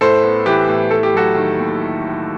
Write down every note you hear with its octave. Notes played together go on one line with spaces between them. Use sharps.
A2 A4 C5
B3
E3 G4 B4
A2
A3 A4
G4
F#3 F#4 A4
D#3
D#2